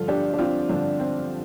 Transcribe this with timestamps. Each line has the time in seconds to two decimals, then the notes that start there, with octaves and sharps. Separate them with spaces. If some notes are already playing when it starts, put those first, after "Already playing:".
Already playing: G2 D3 F3 F4 A4
0.08 D4 G4
0.34 D4
0.38 C4 F4
0.69 G2 D3 F3 D4
1.00 C4